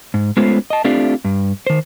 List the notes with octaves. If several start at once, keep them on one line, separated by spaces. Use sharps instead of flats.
G#2
G#3 A3 B3 C#4 F4 C5
D#5 A5
A3 C4 D4 F4 G4 D5
G2
D#3 C5